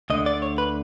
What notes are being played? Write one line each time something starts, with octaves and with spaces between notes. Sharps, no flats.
D2 D3 D#5
D5
C#5
B4